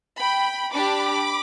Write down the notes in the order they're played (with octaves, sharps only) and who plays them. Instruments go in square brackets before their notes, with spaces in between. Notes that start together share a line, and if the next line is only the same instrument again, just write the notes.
[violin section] G5 B5
D4 G4 B5 D6